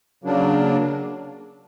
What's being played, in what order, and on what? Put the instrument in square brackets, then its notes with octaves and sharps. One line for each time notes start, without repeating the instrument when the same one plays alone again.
[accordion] C#3 F#3 A#3 D4